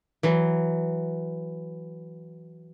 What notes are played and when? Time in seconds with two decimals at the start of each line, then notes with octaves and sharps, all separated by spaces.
0.23 E3 F#3